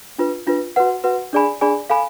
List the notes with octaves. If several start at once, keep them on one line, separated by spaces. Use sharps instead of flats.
D4 F4 B4
D4 F4 B4
F#4 B4 F#5
F#4 B4 F#5
D4 G#4 D5 G#5 B5
D4 G#4 D5 G#5 B5
A4 F5 G#5 B5